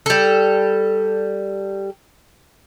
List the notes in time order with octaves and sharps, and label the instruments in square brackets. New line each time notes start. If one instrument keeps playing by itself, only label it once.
[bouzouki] G3 A4